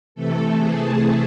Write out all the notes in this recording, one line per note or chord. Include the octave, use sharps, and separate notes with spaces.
C3 E3 A3 A4
G#4